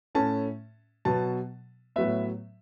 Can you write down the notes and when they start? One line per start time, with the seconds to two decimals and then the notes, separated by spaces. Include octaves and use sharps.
0.15 A2 A3 C#4 A5
1.05 B2 F#3 B3 A5
1.96 A2 F#3 B3 E5